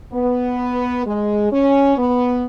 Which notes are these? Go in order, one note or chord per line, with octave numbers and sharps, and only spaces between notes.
B3
G#3
C#4
B3